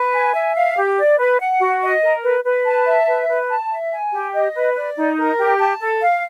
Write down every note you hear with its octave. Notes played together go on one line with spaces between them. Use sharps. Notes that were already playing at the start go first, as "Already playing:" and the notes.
Already playing: B4
G#5
E5
F5
G4
D5
B4
F#5
F#4
D#5
A#4
B4
B4
A5
E5
B4
B4
A5
E5
G#5
G4
D#5
B4
D5
D#4
A#4
G4
A5
A4
F5